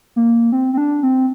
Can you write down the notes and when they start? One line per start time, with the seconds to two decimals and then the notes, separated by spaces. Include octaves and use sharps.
0.16 A#3
0.52 C4
0.73 C4
0.78 D4
1.03 C4